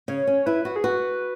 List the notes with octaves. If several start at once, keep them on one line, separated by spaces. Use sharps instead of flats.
C#3 C#5
C#4
E4 B4
F#4
G#4
F#4 B4